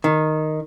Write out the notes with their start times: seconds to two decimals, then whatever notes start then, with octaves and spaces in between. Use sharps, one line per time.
0.04 D#3